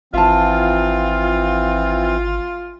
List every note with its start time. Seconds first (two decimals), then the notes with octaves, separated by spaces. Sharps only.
0.14 G#1 E3 C4 F4 E5 A5